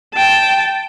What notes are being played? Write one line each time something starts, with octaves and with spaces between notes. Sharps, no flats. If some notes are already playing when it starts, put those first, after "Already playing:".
G5 A5